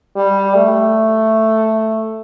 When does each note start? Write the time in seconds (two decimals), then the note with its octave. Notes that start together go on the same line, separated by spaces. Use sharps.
0.16 G3
0.55 A3